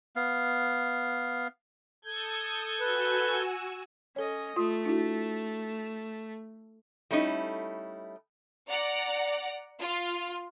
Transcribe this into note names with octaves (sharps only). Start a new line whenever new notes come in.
B3 F5
A4 D#6 G6 G#6
F#4 B4 G#5 E6
C#4 A4 C#5 D#5
A3 F4 C6 D#6
D4 E4 F#4
G3 A3 C#4 D#4 E4
D5 F#5 A#5
F4